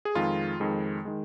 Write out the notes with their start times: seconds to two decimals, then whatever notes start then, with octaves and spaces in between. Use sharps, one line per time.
0.05 G#4
0.15 F2 D#3 G#3 F4
0.60 F2 D#3 G#3
1.05 D#3 G#3